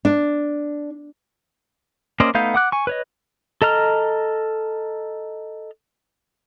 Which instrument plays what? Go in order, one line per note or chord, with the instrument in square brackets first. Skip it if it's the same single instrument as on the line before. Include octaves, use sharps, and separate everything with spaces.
[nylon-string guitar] D4
[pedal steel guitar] A#3 C#4 C5 D5 D#5
A3 B3 D#4 F5 G6
F#5 D6 F#6
G#5 C#6
B4 C#5 D#5
A4 D#5 A#5 F6